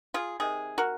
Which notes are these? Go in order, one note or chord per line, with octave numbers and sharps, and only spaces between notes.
F4 G#4
C3 D#3 G#4
F#4 A#4